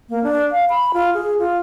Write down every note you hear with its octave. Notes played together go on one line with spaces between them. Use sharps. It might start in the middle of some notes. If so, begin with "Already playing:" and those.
A#3
D4
F5
B5
F4
G#4
F4